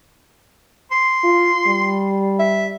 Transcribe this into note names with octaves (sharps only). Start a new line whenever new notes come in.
C6
F4
G3
E5